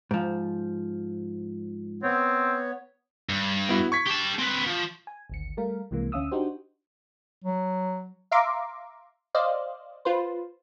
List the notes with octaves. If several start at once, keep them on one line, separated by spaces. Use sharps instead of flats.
G#2 F3
B3 C4 C#5
G2
B3 E4 F#4
C#6 G#6 B6
G4 A5
C4 B4
F3
G#5
G#1 D2 C#7
G3 A3 A#4 F5
C2 C3 E3 G#3 A#3
D2 C#4 E5 F5 D#6 E6
D4 D#4 F#4 G4 C5
F#3
E5 F5 A#5 C6 D6
C5 D5 D#5 F5
F4 B4 C5